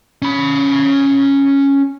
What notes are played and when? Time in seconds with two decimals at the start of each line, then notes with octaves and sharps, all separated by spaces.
0.22 C#4 B5